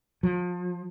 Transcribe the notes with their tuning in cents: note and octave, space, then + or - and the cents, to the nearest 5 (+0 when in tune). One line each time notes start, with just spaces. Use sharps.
F3 +35